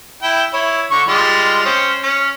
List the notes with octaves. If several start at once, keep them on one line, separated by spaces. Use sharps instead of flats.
E4 G5
E4 C#5
D3 C#6
G3 G#3 F4
C4 C#4
C#4